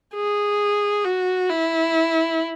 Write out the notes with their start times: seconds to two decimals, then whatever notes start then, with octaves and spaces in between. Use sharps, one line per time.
0.15 G#4
1.04 F#4
1.50 E4